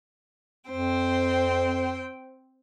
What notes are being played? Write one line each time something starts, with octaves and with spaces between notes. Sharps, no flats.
F2 C4 C5 G5